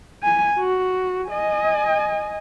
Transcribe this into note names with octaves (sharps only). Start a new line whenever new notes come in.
G#5
F#4
D#5 G#5